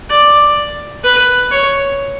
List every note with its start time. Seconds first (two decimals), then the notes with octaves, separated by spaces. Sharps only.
0.10 D5
1.04 B4
1.51 C#5